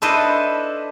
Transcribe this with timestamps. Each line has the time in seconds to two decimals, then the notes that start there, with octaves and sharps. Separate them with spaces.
0.02 D4 E4 A4 B4 C5 D#5